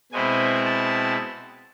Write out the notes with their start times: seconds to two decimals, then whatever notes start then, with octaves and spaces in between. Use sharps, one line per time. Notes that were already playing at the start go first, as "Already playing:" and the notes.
0.12 B2 G#3 C4 E4 G#5
0.65 A5